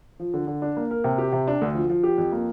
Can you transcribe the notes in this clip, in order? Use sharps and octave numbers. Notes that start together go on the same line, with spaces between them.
F3
D3
D3
D4
A#3
A#4
C3
G4
C3
D4
D2
F3
F3
G4
F2
A#3